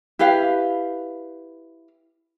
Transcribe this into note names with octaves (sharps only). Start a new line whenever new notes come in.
E4 G4 B4 F5